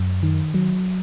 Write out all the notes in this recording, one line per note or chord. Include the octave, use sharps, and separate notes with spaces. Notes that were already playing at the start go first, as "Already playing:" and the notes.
Already playing: F#2
D#3
F#3